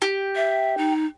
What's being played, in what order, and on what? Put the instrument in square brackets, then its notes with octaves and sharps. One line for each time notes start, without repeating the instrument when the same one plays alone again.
[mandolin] G4
[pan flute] E5
D#4